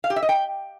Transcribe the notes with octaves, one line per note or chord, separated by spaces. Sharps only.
F5
G4
E5
D#5
G5